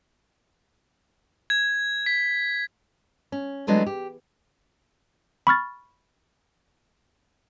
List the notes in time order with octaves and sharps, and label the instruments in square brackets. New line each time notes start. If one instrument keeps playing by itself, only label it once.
[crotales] G#6
B6
[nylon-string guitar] C#4
E3 F#3 G#3 A3 B3 D4
G4
[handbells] B5 C#6 F6 A6